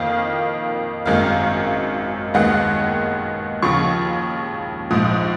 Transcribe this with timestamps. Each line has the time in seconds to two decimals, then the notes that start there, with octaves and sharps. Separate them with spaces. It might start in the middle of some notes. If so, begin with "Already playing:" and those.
Already playing: F2 D#3 A#3 F5
1.05 G#1 F#2 D#3 G#3 F5
2.34 D#2 D#3 G#3 B3 F#5
3.62 D#2 C#3 F3 C#6
4.91 A#1 G#2 F3 D#6